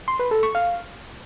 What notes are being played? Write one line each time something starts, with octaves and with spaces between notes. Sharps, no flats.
C6
B4
A4
C#6
F5